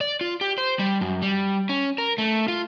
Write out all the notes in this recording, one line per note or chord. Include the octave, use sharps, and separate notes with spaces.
D5
F4
G4
C5
G3
F#2
G3
C#4
A#4
A3
F4